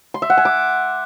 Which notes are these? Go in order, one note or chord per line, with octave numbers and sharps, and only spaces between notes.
C6
E5
F#5
G#5
D6